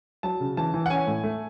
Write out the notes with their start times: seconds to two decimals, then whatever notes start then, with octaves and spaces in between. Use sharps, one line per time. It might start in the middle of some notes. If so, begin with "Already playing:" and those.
0.23 F#3 A5
0.40 C#3
0.57 E3 A5
0.74 E3
0.86 F#5
0.90 C#4 G#5
1.07 A2
1.24 A3